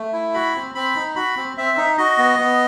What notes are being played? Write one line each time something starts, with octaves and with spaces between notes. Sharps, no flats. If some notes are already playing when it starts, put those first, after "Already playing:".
Already playing: A3
E4
F#4 B5
C4
C4 B5
D#4
F#4 B5
C4
C4 E5
D#4
F#4 D#5
B3
B3